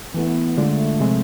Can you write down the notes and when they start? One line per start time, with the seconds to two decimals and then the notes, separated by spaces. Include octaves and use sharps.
0.14 E3 A3 B3 E4
0.57 D3 G#3 A3 D4 F4
1.00 C3 F3 G#3 C4